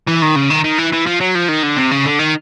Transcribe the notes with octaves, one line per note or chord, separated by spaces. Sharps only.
E3
D#3
C#3
D#3
D#3
E3
E3
F3
F#3
F3
D#3
D3
C3
C#3
D3
D#3